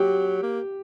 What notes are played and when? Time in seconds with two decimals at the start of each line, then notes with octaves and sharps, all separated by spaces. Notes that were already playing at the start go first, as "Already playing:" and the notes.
Already playing: F#3 G4
0.42 A#3